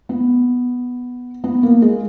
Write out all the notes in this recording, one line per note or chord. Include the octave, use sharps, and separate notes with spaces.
B3
B3
A#3
G#3